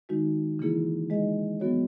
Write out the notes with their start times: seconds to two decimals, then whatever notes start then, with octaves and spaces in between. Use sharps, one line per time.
0.09 D#3 G#3 D#4 F#4
0.59 C#3 E3 A#3 E4 G#4
1.10 G#3 D#4 G#4 D#5
1.60 F#3 B3 F#4 C#5